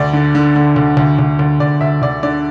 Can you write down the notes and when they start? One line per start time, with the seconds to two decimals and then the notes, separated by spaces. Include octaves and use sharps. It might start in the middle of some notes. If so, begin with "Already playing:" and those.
Already playing: D2 D5
0.13 D3
0.35 D3
0.56 D3
0.76 D2
0.97 D2
1.19 D2
1.39 D2
1.60 D2 D5
1.81 D2 E5
2.02 D2 D5
2.23 D3 D5